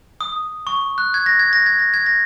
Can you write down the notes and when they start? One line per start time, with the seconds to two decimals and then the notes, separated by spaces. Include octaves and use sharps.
0.21 D#6
0.67 C#6
0.98 F#6
1.14 G#6
1.26 A#6
1.40 G#6
1.53 A#6
1.66 G#6
1.79 A#6
1.94 G#6
2.06 A#6